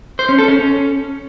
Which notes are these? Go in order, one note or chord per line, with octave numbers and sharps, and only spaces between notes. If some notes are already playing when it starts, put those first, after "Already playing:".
C5
C#4
A4
C#4